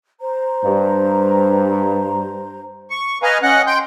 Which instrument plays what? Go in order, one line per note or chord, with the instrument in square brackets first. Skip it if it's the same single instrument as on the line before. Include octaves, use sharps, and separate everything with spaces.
[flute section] C5 A#5
[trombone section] G2
[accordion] C#6
B4 D#5 F5 G#5 A#5
C#4 D#5 F#5 F#6
G5 C6 G6